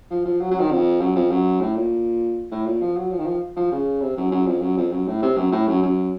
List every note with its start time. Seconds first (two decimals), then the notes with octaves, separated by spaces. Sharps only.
0.10 F3
0.25 F3
0.40 F#3
0.51 F#3
0.60 D#3
0.71 F2
1.01 F#2
1.15 F2
1.31 F#2
1.61 A2
1.76 A#2
2.51 A2
2.66 A#2
2.82 F3
2.96 F#3
3.11 F3
3.19 D#3
3.26 F3
3.56 F3
3.72 C#3
4.01 C3
4.17 F#2
4.31 F#2
4.47 F2
4.62 F#2
4.77 F2
4.92 F#2
5.07 A2
5.22 C3
5.37 F#2
5.52 A2
5.67 F#2
5.82 F#2